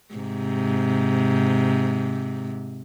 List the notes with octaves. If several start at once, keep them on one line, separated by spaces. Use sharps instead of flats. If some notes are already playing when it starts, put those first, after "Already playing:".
G#2 C3